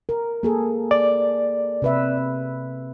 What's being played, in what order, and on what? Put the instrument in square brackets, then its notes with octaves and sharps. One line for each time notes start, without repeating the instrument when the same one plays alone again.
[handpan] A#4
A#3 G#4 A4
[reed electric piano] D5
[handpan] C3 B4 E5